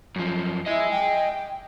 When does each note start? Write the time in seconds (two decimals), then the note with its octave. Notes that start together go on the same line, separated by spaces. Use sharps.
0.16 F#2 F3
0.67 E4 D#5 G#5
0.91 G5